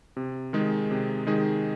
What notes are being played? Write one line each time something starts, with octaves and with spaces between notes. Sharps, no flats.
C3
D#3 G#3 D#4 G#4
C3
D#3 G#3 D#4 G#4